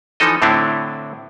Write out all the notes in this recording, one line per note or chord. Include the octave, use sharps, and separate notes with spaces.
E3 F3 D#4 A4 D#5
A2 D3 C4 D4 E4